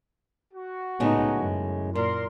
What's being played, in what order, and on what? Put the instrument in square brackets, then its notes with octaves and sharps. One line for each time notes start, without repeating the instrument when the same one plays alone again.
[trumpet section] F#4
[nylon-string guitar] A2 C#3 G#3 [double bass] B3 D#4
[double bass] F#2
[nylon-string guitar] A#2 [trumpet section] A#4 C6